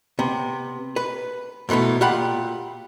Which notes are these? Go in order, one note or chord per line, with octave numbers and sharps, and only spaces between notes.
C3 B3
B4
G#2 B2 E3 A3 B3
A#2 F4 G4 F5 F#5 B5